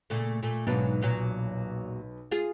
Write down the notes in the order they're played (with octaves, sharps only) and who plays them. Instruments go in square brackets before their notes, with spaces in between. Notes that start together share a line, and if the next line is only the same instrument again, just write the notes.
[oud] A#2 C#3 A3
A#2 A3
[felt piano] B1 B4 [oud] G#2 F#3 D4
[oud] E2 A#2 F#3
F4 G#4